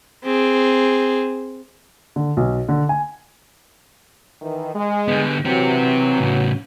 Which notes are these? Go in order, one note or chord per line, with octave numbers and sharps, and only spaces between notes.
C4 G#4
D3
B1
D3
G#5
D#3 E3
G#3
D3 B3
E3 F#3 C4 G4
A2 C#3